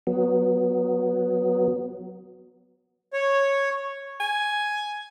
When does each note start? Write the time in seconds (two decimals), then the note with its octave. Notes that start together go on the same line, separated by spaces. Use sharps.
0.07 F#3 B3
3.13 C#5
4.20 G#5